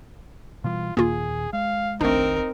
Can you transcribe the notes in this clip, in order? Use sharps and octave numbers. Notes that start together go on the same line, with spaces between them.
B2 E3 G3 F4
D#2 A#2 D#3 A#3 F4 G#4
G#3 F5
F1 A#1 D#3 A3 C4 D4 D#4 A#4